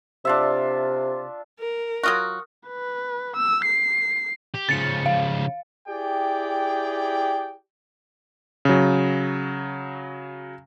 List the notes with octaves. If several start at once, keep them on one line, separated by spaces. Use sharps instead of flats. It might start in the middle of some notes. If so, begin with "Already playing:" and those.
C3 D4 F4 E5
A#4
F#3 F4 F#4 D#6 F6 F#6
B4
E6
C7
G4
C#3 F3 A6 C#7
F5
E4 G4 G#4 D5 G5
C#3 F#3